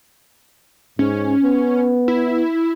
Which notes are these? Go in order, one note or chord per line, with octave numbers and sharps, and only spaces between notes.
G#2 C#4
B3
E4